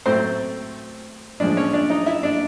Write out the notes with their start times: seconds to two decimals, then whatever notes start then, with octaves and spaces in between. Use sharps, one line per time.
0.06 A2 F#3 A3 C4 C5
1.40 A2 F3 G#3 D4 D5
1.57 C#4 C#5
1.73 D4 D5
1.90 D#4 D#5
2.06 E4 E5
2.23 D4 D5